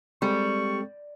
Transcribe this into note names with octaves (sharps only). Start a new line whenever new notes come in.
G3 G#3 C4 A4 C#6